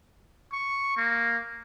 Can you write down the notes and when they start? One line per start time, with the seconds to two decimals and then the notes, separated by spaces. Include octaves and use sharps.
0.53 C#6
0.97 A#3